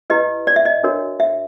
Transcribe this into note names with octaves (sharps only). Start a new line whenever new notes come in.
E4 G4 B4 D#5
D5
E5
D#5
D4 F#4 A#4 C#5
E5